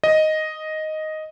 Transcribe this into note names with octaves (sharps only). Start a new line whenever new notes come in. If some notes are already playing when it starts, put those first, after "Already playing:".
D#5